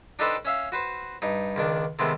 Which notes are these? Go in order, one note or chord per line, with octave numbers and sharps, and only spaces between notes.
D4 D#4 G4 A4 B4 C5
C#4 E5 F5
F#4 B4 C5
G2 D#4
C#2 D#3 D4
C3 D#3 G#3 A3 B3